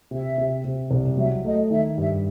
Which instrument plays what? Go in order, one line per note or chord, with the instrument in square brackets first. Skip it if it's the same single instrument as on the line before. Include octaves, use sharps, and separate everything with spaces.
[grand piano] C3 [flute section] E5
[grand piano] C3
C3
C2
[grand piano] F#3 [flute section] E5
[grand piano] A3 [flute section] D#5
[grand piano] D#3 [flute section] E5
[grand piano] G2 [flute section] E5